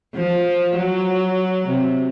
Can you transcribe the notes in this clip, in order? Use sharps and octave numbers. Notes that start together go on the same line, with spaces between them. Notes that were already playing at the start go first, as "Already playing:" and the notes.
F3
F#3
C3